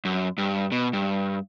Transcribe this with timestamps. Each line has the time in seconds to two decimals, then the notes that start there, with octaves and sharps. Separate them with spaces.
0.05 F#2
0.38 G2
0.72 B2
0.93 G2